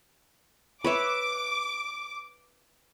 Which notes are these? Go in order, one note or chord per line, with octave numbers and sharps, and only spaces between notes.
B4 C#5 E5 D6